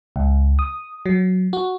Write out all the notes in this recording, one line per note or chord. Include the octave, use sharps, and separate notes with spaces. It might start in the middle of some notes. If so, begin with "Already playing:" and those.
C#2
D#6
F#3
F#4